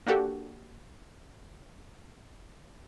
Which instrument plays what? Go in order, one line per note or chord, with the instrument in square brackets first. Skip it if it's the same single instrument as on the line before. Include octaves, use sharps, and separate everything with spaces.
[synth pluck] A#3 D4 F#4 G4 A4